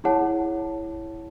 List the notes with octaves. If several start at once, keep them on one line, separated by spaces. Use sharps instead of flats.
E4 G#4 C#5 F#5 A5